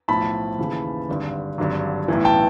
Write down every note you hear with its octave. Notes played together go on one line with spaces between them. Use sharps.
B1 A2 F3 A5 B5
D#2 C#3 E3
G#1 G2 D3
G#1 G2 D3 F#3
B1 A2 E3
G5 A5